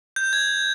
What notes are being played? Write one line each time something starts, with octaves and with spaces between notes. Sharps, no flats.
G6
G#6